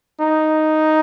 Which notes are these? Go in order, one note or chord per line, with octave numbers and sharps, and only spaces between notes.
D#4